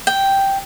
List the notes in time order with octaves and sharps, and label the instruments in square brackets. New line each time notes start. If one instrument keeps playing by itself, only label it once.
[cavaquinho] G5